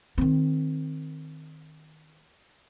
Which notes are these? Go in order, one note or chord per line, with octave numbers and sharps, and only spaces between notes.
D#3 C4